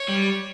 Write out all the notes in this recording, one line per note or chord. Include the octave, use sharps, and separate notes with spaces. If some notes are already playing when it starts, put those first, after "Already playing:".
Already playing: C#5
G3